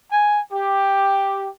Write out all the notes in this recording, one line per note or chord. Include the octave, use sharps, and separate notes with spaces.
G#5
G4